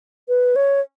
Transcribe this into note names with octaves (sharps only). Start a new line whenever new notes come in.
B4
C#5